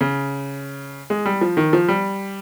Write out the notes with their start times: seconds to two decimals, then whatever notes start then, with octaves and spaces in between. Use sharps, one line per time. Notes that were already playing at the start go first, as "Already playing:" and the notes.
0.01 C#3
1.10 G#3
1.26 G3
1.41 F3
1.57 D#3
1.73 F3
1.89 G3